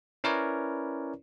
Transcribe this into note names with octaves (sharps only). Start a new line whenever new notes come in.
C#4 E4 A#4 B4 C#5 D5